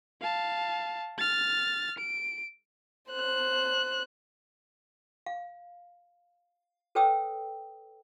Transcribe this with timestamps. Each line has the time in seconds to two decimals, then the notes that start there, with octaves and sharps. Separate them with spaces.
0.21 F5 A5
1.18 F6 A6
1.98 D7
3.10 C5 F#6
5.26 F5
6.95 A4 B4 C#5 G5 D#6 E6